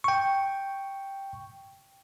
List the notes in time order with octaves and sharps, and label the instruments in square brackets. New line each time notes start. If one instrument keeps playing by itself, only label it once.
[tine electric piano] G5 C#6